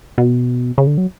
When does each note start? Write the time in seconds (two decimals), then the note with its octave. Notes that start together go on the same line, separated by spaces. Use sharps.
0.18 B2
0.78 C#3
0.87 D3
0.98 F#3